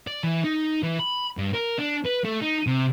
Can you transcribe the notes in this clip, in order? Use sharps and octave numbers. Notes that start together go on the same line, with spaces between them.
D5
E3
D#4
E3
B5
G2
A#4
D4
B4
A3
D#4
C3